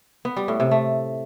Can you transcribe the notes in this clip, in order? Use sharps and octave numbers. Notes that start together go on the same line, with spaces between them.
B3
G3
A2
C3
A3